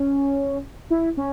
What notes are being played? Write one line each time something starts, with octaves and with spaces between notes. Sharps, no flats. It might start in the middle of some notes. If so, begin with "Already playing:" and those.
Already playing: C#4
E4
C#4